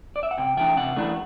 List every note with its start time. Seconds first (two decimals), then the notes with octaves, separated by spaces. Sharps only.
0.16 D5
0.23 E5
0.31 F#5
0.38 C3 G5
0.57 E3 A3 D4 G5
0.77 C3 F#5
0.97 E3 A3 D4